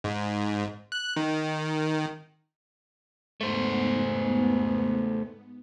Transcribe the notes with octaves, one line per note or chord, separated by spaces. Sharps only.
G#2
F#6
D#3
G#2 A3 B3 C5